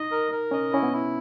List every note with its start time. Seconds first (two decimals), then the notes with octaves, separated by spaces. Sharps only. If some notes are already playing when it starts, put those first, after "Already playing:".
Already playing: D#4 D#5
0.11 A#4
0.32 A#4
0.51 C#4 D#5
0.72 C#4 E4
0.83 B3
0.93 E4